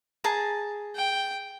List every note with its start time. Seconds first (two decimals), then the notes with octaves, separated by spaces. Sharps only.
0.24 G#4 A5 A#5
0.95 G5